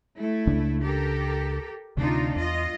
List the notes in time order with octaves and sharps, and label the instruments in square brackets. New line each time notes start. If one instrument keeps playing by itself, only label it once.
[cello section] A3 E4
[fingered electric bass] C#2 C#3 D4
[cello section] G4 A4 A#4
[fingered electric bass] D2 C3 [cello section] D4 D#4 F4
[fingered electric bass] E2 [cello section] F4 D#5